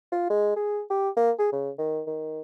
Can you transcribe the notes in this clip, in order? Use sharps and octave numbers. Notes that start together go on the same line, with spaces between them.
F4
G#3
G#4
G4
A#3
G#4
C#3
D#3
D#3